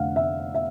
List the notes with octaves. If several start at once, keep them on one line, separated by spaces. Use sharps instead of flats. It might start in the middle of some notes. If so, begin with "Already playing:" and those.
Already playing: F1 D3 F5 F#5
E5
E5